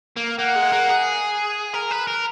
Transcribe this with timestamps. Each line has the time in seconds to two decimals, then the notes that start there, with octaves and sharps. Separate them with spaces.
0.17 A#3
0.39 A#3 F#5
0.56 G#3
0.72 A#3
0.89 G#4
1.74 A#4
1.91 B4
2.07 A#4